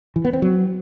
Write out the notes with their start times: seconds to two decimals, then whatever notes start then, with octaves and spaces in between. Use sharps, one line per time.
0.16 E3
0.25 B3
0.33 C4
0.42 F#3